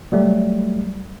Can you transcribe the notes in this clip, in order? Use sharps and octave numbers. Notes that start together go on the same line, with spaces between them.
F#3 G3 A3